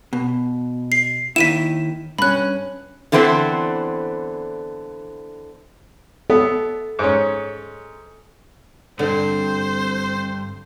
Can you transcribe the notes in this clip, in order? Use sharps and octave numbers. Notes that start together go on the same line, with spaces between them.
B2
C7
D#2 D#3 E4 B6 D#7 E7
G2 C#4 B5 F#6
D3 E3 B3 C4 A4 C5
B3 A4
G#2 C#4
G2 D3 C4 C5